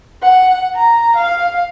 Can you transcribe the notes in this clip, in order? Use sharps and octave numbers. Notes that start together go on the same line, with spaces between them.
F#5
A#5
F5